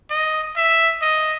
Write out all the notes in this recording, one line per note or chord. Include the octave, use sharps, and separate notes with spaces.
D#5
E5
D#5